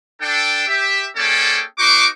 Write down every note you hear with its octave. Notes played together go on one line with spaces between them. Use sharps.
D4 A4 G5
G4 E5
A#3 C#4 G#4 A4 D5 G5
D#4 F#4 C5 C#6 D6